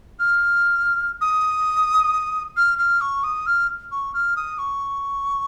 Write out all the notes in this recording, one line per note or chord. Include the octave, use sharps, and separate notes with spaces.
F6
D#6
F6
F6
C#6
D#6
F6
C#6
F6
D#6
C#6